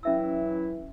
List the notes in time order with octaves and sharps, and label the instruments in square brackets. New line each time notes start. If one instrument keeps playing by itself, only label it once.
[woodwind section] E3 F#3 E4 [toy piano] C#4 E5 E6